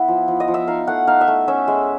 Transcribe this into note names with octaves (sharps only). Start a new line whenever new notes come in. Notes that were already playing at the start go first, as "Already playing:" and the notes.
Already playing: B3 E4
F3
F3
D#5
F3
E5
D#4 F5
A3 F#5
D#4 F5
E5
A3
C#4 E5
G#3